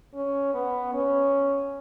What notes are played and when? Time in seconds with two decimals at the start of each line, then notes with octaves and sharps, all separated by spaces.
0.14 C#4
0.54 B3
0.94 C#4